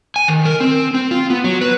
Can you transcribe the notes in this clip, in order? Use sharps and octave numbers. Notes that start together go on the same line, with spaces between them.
G#5
D#3
A#4
C4
C4
F4
B3
F#3
B4